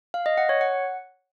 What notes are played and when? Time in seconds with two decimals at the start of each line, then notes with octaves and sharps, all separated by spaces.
0.14 F5
0.26 D#5
0.38 F#5
0.49 C#5
0.61 F#5